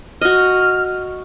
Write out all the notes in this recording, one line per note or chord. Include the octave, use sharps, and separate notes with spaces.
F#4 D#5 F6